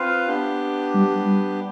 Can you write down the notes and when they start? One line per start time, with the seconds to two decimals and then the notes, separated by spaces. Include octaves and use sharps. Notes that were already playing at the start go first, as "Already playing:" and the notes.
Already playing: C4 F4 B4 F5
0.28 B3 D4 G4
0.95 G3